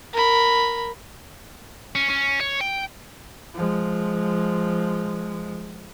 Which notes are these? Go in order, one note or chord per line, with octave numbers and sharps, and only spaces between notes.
A#4 B5
C#4
C#4
C#5
G5
F3 G#3